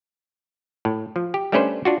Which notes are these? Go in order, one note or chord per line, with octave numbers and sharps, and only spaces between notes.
A2
F3
G4
G3 A3 C#4 D4 B4 C5
D4 F4 F#4